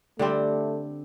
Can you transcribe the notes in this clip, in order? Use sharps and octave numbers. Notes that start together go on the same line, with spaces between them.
D3 G3 A3 C4